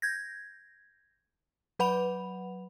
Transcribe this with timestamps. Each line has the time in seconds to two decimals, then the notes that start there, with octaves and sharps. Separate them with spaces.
0.02 G6 G#6 A#6
1.79 F#3 B4 F#5 B5 F7